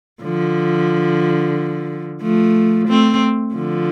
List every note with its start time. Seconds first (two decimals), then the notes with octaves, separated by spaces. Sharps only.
0.23 D3 F3
2.22 F3 A3
2.88 A3 C4
3.55 D3 F3